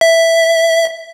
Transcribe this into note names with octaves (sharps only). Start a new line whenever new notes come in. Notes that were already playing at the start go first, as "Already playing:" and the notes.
E5